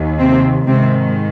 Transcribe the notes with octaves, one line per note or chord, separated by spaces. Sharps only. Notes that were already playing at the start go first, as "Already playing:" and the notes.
Already playing: D#2 D#3
C3 C4
G#2 C3 D#3 C4